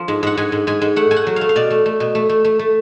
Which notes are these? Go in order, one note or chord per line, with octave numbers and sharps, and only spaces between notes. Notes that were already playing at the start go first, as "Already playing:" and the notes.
Already playing: F3
G#2
G#2 F#5
G#2 G#5
G#2
G#2 G#5
G#2
A3 F#5
A3 G#5
F#5
F#3
A3 F5
F5
B2 D5
A3
A3
B2
A3
A3
A3
A3